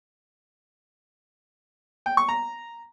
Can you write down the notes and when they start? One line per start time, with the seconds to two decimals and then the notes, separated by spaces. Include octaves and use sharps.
2.06 G5
2.17 C#6
2.29 A#5